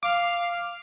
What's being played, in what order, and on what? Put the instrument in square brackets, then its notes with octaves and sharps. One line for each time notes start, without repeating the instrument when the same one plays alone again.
[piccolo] F5 [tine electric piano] D6